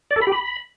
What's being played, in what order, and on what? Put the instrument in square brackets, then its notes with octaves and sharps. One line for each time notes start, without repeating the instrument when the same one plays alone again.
[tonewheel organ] D5
A4
B5
G4
B5